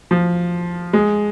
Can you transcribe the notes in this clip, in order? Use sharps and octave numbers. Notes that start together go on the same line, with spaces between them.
F3
G#3